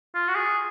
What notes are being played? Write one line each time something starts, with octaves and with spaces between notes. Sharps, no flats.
F4
F#4
G#4